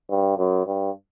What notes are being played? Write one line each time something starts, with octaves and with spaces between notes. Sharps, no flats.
G2
F#2
G2